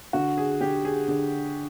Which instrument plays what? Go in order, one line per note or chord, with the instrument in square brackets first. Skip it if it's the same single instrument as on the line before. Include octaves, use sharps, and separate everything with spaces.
[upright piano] D3 [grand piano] F#4
[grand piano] G#4
[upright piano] D3 [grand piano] G4
[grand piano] G#4
[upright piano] D3 [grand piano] G#4